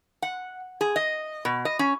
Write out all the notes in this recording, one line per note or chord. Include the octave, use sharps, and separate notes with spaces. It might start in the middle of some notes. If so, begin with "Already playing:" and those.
F#5
G#4
D#5
B2
D#5
C#4